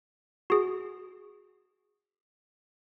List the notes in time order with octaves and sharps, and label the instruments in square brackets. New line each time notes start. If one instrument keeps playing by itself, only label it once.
[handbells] F#4 G#4